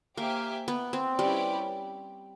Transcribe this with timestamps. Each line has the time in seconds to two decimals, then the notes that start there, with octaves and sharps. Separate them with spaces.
0.17 A#3 G4 C5 E5 G#5
0.68 B3
0.93 C4
1.19 G3 C#4 E4 G4 B4 D5